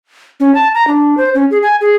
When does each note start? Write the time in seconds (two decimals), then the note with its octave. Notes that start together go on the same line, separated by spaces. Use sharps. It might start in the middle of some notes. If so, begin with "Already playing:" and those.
0.40 C#4
0.55 A5
0.74 A#5
0.88 D4
1.17 C5
1.35 C#4
1.51 G#4
1.63 G#5
1.81 G#4